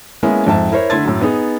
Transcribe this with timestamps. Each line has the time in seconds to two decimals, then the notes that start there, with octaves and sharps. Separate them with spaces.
0.23 G#3 A#3 B3 C#4 E4
0.47 F2 G#2 E5 A5
0.72 E4 A#4 C5 C#5
0.90 D3 A3 E4 C6 G#6 A6
1.05 F#2 A2
1.21 B3 D#4 G#4